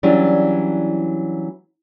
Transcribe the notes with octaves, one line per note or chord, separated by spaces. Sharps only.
E3 F#3 G3 C#4 D4